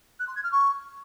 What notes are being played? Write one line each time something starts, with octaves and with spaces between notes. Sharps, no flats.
F#6
C6
G#6
F6
C#6